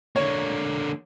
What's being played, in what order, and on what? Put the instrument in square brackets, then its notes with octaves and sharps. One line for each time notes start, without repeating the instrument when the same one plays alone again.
[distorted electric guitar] D3 A#3 [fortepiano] C#5